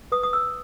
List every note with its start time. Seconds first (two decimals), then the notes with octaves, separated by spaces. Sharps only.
0.12 B4 D#6
0.23 D#6
0.33 E6